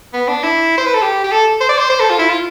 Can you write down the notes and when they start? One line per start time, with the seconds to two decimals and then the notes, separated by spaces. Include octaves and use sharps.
0.14 B3
0.28 D4
0.43 E4
0.78 C5
0.86 B4
0.94 A4
1.02 G4
1.24 G4
1.32 A4
1.61 C5
1.69 D5
1.78 C5
1.90 C5
2.00 A4
2.10 F4
2.19 E4
2.29 F4